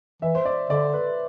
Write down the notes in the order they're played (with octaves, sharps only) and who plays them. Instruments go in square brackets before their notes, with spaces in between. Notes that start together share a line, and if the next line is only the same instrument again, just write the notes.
[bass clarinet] E3 [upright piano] E5
[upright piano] C5
D5
[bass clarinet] D3 [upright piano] D5
[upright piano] B4